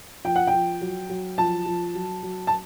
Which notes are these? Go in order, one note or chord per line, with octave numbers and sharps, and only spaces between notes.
F3 G5
F#5
G5
F3
F#3
F#3
F3 A5
F3
F#3
F#3
A5